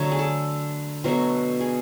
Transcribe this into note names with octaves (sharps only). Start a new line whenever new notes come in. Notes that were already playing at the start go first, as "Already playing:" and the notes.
Already playing: D3 F#3 A3 C#5
G#4
A4
B2 F#3 A3
G#4